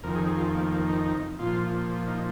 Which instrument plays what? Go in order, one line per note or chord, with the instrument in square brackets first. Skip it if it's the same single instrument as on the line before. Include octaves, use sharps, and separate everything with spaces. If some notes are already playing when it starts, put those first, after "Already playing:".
[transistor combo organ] F2 D#3 A#4
G#4
G#4
F4
A#3
A#3
D#4
D#4
A#2 F3 F4
D#4